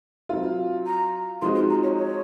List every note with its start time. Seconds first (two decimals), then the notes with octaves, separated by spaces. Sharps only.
0.29 F#3 C4 F4
0.86 A#5
1.42 F3 G#3 C4 D#4 F#4 C6
1.55 C6
1.70 A#5
1.83 C#5
1.98 C#5